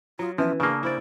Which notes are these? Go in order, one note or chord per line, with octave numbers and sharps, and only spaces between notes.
F#3 F4 A#5 D#6
E3 F3 B3 C#4 E5
C#3 A#3 D4 G#4 A5
E4 C5 D5